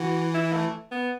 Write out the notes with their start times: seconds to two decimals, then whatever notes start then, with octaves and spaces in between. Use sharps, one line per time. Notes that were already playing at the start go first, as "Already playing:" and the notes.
Already playing: E3 F#4
0.34 E4
0.53 A3
0.91 B3